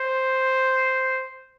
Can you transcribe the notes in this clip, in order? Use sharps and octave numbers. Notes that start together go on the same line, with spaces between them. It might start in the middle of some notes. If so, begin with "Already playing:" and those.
Already playing: C5